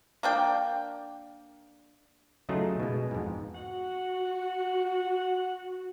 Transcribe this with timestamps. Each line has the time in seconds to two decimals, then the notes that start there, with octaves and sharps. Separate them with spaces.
0.23 A#3 D4 G5
2.49 C#3 F#3 A3 D#4 F4 G#4
2.80 B2 G#3
3.11 F2 G#2
3.55 F#4 F#5